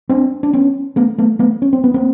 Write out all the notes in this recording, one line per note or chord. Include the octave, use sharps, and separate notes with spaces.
C4 D4
D4
B3 C#4
A3 B3
A3 B3
A3 B3
C#4
C4
B3
A#3 C4